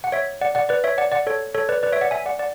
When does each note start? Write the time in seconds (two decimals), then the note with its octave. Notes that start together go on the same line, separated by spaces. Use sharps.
0.04 F#5
0.12 C#5 E5
0.41 D5 F#5
0.55 D5 F#5
0.69 B4 D5
0.84 C#5 E5
0.98 D5 F#5
1.12 D5 F#5
1.27 A4 C#5
1.55 A4 C#5
1.69 B4 D5
1.83 B4 D5
1.92 C#5 E5
2.01 D5 F#5
2.11 E5 G#5
2.26 D5 F#5
2.39 D5 F#5